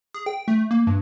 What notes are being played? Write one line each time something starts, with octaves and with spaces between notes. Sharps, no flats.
G#4
G5
A3
A#3
G2